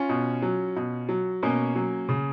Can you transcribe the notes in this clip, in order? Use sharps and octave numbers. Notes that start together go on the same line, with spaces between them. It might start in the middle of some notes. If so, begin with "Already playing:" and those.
Already playing: C#4 F4
B2
F#3
B2
F#3
B2 A#3 C#4
F#3
C#3